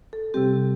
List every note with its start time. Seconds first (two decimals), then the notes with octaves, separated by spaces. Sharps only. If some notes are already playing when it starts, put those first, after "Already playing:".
0.13 A4
0.34 C3 G3 C4 G4